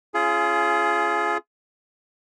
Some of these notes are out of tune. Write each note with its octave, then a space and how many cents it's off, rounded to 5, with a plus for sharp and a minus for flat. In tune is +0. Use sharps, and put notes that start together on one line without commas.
C#4 +0 F4 -25 G#4 +20